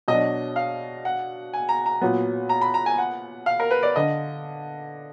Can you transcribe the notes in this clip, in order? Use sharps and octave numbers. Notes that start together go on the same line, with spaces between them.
B2 F#3 D4 D#5
F5
F#5
G#5
A#5
A#5
A#2 F#3 B3
A#5
B5
A#5
G#5
F#5
F5
A#4
B4
D5
D3 D#5